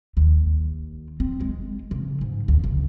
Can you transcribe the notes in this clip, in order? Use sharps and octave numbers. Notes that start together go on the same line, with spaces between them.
D#2
C4
G#3
C#3
G#2
D2
C#3